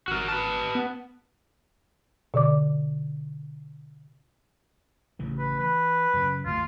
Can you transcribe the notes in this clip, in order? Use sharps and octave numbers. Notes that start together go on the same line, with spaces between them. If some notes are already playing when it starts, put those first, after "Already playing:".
G#1 F#4 A#4
B4 A5
B3
B2 D3 D5 D6
A1 C#3 E3
B4
E3 B4
F#2 C#3
G#1 D#2 A3 F4